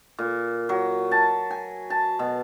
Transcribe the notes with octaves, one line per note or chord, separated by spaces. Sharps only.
A#2
F#3
A5
G#5
A5
B2